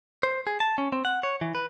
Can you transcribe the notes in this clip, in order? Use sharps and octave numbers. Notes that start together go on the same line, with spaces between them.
C5
G#4
A5
C#4
C4
F#5
C#5
E3
B4